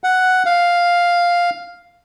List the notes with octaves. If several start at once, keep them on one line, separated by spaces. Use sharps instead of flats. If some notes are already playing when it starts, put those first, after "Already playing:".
F#5
F5